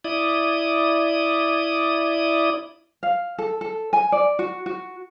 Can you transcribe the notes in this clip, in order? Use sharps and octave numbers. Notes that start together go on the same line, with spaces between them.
E4 D5 D#6
F5
A4
A4
G#5
D5
F#4
F#4